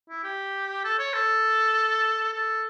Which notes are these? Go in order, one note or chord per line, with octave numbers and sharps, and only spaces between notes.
E4
G4
A4
C#5
A4
A4